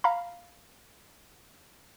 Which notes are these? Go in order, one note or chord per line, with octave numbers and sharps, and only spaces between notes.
F5 A#5 B5